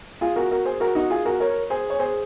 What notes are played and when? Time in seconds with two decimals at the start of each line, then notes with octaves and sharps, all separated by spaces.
0.21 F4 G#4
0.36 F#4 A#4
0.51 F#4 A#4
0.65 G#4 C5
0.80 F#4 A#4
0.95 D#4 F#4
1.10 F4 G#4
1.25 F#4 A#4
1.40 A#4 C#5
1.70 G#4 C5
1.90 C#5
1.99 G#4 C5